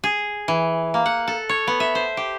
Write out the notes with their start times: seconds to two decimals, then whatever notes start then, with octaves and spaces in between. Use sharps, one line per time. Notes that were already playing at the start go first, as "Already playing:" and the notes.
0.04 G#4
0.48 E3
0.94 A#3
1.06 F#5
1.28 A4
1.49 C#5
1.67 B3
1.80 E5
1.95 C5
2.17 G4